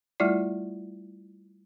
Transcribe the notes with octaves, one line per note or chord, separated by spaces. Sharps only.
G3 A3 E4 F4 D5